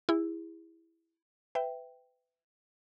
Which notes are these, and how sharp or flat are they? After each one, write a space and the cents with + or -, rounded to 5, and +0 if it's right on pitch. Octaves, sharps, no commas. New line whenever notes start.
E4 +0 G#4 -35
B4 +25 E5 +0 G5 +0